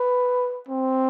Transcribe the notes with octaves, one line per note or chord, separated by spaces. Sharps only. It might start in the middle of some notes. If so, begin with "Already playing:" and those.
Already playing: B4
C4